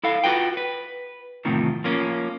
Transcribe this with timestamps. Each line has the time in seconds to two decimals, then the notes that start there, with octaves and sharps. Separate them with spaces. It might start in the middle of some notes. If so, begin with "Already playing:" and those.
0.03 E4 A4 F5
0.24 F4 F#4 B4 G5
0.57 B4
1.45 E2 A2 C3 D#3 F3
1.84 F3 A#3 C#4